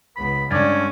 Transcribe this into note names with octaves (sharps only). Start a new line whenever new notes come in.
C#2 B3 B5
G2 D3 G#3 C#4 D4 D6 G#6 A6